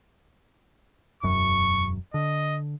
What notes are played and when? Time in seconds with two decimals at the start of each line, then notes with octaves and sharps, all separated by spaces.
1.23 E1 F#2 C#6
2.14 D3 D#5